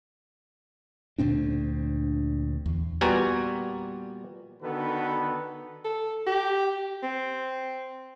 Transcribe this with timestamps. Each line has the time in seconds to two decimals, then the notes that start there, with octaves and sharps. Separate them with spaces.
1.18 D2 A#2 C4 D4
2.66 E2
3.01 A#2 G3 B3 F#4 G#5 A#5
4.62 D3 D#3 B3 F#4 A4 B4
5.85 A4
6.26 G4
7.03 C4